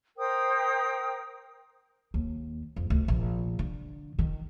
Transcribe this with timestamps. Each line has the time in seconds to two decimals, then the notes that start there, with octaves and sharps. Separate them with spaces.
0.18 A#4 C5 G5 D#6
2.14 D#2
2.76 F2
2.90 D2
3.08 A#1
3.59 D3
4.19 D#3